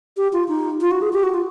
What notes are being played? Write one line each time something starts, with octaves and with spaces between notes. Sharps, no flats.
G4
F4
D#4
F4
F#4
G#4
G4
F#4
F4